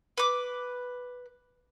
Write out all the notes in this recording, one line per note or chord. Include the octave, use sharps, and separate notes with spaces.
B4 D6